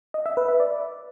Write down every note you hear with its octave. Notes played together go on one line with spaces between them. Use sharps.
D#5
E5
B4
E5
D5